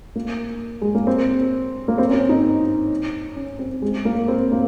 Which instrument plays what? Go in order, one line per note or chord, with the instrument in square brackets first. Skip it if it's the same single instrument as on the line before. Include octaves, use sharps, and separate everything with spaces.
[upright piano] A#3
G#3
A#3
C4
A#3
C4
C#4
C4
D#4
C#4
C4
G#3
A#3
C4
A#3